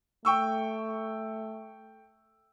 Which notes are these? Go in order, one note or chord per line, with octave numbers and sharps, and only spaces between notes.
A3 G5 C#6 E6